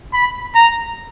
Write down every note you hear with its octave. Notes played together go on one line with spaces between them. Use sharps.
B5
A#5